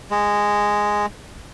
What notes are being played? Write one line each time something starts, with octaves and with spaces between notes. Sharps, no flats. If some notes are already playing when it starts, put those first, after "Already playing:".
G#3